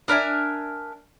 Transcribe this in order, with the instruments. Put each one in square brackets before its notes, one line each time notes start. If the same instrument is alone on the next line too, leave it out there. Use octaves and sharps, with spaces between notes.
[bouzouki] D4 A#4 E5 G#5